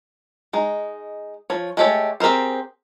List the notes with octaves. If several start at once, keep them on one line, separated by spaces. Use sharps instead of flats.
G#3 D#4
F3 C#5
G#3 A3 G4 A4 C#5
C4 G4 G#4 A#4 C5